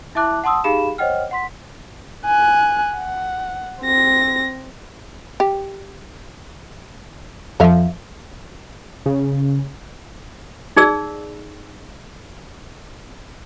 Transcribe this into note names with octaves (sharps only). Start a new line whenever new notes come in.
E4 E5 A5 D6 F#6
F#5 A5 C6 D#6 E6
D#4 G4 G#4 F5 B5 E7
C5 C#5 D#5 F#5 G5 F6
F#5 C6 B6
G#5 F#6
F#5
C4 A#6
G4
F2 F3 A4 E5 F5
C#3
D#4 G#4 D5 E6